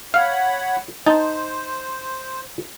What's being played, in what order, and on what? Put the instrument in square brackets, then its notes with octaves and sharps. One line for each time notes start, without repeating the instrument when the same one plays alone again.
[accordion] C#5 F#5 B5 [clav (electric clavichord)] F5
[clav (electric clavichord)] D#4 A5 [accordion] C5